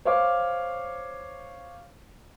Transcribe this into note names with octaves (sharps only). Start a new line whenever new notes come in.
C5 C#5 F5 D6